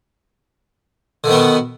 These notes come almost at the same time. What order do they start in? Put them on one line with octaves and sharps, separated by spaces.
D3 D#3 B3 B2